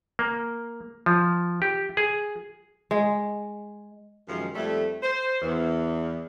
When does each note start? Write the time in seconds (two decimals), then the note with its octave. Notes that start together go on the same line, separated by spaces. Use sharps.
0.19 A#3
1.06 F3
1.62 G4
1.97 G#4
2.91 G#3
4.28 F#2 C3 D#3 F3 G#3
4.54 F2 G3 A3
5.02 C5
5.41 E2